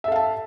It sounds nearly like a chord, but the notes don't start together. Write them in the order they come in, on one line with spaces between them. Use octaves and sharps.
E5 A4 F5 A5